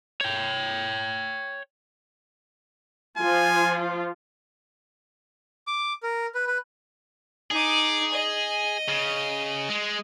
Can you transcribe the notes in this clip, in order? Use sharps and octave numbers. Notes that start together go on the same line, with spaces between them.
C#5 G5
F3 F4 G#5
D6
A#4
B4
B4
D#4 G#4 D6
D#5
C#3
G#3